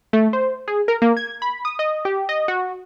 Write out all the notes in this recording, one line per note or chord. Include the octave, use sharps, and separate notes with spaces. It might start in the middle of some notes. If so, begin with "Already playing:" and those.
A3
C5
G#4
A#4
A#3
G#6
B5
D#6
D#5
G4
D#5
F#4